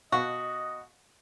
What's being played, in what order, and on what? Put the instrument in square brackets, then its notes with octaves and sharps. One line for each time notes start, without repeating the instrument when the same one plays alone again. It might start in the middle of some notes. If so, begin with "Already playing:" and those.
[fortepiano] B2 F5 [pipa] F#4 [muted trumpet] D#5